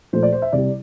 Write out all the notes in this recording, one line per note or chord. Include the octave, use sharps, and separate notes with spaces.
A#2 F3 A3 C5
D5
C5
E5
C2 C3 G3 D5